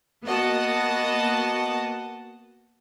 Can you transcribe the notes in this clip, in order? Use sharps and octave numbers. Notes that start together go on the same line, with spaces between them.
A#3 B3 F#4 D#5 F#5 A5